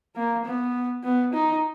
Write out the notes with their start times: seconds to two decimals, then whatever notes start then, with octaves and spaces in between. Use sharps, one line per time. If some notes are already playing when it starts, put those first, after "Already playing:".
0.16 A#3
0.45 B3
1.04 B3
1.34 D#4